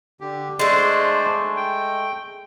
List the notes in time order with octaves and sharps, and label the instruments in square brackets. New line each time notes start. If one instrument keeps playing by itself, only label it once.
[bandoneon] D3 G4
[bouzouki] G#3 A3 [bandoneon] D4 C5 D5
[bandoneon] G5